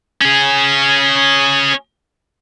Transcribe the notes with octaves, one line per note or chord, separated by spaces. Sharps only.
C#4 G#4